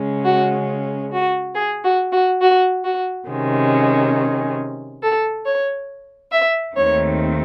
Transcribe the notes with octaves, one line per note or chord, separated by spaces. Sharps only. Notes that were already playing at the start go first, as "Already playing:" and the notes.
Already playing: C#3 G#3 C#4
F#4
F#4
G#4
F#4
F#4
F#4
F#4
C3 D#3 G#3 C#4
A4
C#5
E5
D#2 D#3 A3 C4 C#5